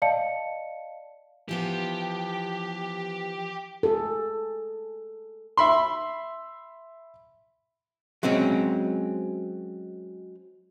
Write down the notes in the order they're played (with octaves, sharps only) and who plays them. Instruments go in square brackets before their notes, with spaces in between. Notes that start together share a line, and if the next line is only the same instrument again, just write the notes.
[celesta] D5 D#5 F5 A5 C#7
[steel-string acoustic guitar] E3 F3 B3 [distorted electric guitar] G4
[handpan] G#4 A4
[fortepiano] E5 B5 C6
[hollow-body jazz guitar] F#3 G#3 C4 C#4